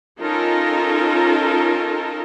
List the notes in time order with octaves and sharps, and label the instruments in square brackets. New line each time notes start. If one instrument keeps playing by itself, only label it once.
[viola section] C#4 D#4 F4 A4 A#4